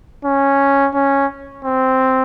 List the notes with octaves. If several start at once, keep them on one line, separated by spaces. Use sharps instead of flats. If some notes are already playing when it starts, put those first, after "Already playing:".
C#4
C#4
C4